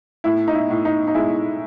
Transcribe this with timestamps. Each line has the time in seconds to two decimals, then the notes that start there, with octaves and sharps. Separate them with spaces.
0.24 A2 E4
0.48 D#4
0.55 E4
0.70 A2
0.85 D#4
1.07 D#4
1.15 G#3 E4